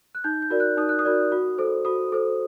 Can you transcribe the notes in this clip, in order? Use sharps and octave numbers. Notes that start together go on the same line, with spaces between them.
F#6
D#4 G6
G6
F#4 A#4 D5
F#6
D#4 D#6
F#6
D#6
F#4 A#4 D5
F#4
A4 C5
F#4 D#6
A4 C5